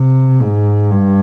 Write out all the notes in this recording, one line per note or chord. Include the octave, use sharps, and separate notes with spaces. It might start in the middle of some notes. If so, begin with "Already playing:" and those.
Already playing: C3
G#2
G2